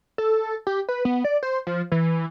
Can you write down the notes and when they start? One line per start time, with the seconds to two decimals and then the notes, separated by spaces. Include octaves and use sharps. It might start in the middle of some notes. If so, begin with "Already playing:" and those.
0.18 A4
0.67 G4
0.89 B4
1.05 B3
1.24 D5
1.43 C5
1.67 F3
1.92 E3